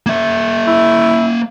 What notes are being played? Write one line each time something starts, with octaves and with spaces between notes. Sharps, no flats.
A#3 E5
E4